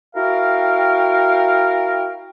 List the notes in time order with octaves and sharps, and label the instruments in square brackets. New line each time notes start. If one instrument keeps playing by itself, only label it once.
[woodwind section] E4 F#4 A#4 F5 G5